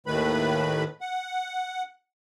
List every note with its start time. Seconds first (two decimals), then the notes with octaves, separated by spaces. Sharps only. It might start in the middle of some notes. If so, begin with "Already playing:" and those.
0.06 D#2 A2 D#3 A3 B4 B5
1.01 F#5